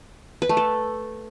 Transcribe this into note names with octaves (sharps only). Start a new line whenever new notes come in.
B4
A3
A4